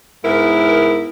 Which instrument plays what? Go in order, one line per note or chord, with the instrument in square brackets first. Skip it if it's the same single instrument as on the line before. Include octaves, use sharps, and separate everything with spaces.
[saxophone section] G#2 B3 E4 A#4